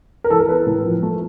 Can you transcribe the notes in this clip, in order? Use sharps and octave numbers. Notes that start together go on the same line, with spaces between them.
A#4
E3 A4
A#4
B3 B4
A2
F3
A3